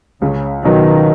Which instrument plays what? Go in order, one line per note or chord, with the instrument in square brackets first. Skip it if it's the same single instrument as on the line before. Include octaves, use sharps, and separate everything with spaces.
[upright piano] C#2 [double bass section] C#3
[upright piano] B2 F#3 B3 D#4 [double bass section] D#3